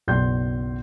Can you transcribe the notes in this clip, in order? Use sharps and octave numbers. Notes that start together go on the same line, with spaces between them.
F#1 B1 D5 C6 G6